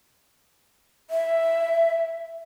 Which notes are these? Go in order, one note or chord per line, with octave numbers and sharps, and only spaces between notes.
E5